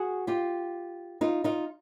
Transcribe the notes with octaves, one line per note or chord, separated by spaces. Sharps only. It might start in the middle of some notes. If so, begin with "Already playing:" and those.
Already playing: F#4 G#4
F4 G4
D#4 F4
D#4 F4